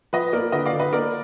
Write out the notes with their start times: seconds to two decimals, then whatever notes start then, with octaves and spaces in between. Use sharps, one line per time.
0.13 F3 B4 D#5
0.33 A#3 A#4 D5
0.52 D3 B4 D#5
0.66 D5 F5
0.73 D3
0.79 B4 D#5
0.93 A#3 A#4 D5